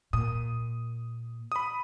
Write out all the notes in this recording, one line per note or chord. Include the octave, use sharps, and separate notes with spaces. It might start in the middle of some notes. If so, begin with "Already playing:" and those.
A#2 D#6
B5 D#6